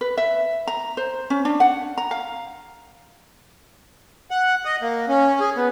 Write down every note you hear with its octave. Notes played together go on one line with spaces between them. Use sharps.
B4
E5
A#5
C5
C#4
D4
F#5
A#5
F5
F#5
D#5
A#3
C#4
G#4
B3